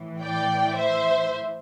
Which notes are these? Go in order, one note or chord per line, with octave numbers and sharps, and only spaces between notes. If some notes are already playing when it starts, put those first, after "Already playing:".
Already playing: A2 E3
D5 G5
C5 E5